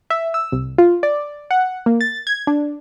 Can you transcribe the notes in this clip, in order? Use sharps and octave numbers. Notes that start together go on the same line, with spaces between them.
E5
E6
C2
F4
D5
F#5
A#3
A6
G#6
D4